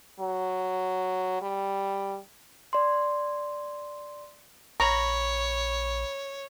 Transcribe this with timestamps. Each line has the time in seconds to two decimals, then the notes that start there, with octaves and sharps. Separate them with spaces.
0.20 F#3
1.42 G3
2.73 D5 C6
4.80 A#1 C#5 A#5 B5 C#6